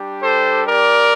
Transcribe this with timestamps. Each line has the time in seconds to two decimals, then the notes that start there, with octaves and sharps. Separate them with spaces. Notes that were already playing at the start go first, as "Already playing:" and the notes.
Already playing: G3 D4 G4
0.22 A4 C5
0.67 A#4 D5